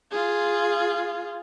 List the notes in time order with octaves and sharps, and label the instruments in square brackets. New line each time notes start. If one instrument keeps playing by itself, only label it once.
[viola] F4 G#4